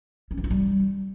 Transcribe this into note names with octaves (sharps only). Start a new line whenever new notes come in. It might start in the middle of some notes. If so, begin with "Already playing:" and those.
C#4
E3
F4
G3